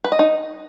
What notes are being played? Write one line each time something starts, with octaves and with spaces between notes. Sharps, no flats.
B4
D#5
D#4